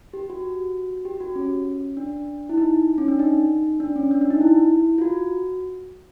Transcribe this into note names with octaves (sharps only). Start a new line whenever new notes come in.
G4
F#4
G4
F#4
C#4
D4
E4
D#4
C#4
D4
D#4
D4
C#4
D4
D4
D#4
E4
F4
F#4